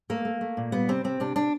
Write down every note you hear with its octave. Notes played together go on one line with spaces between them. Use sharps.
A3 A#3
A3
A3
A#2
G3 B3
C3 C4
C3 C4
C3 D4
C3 D4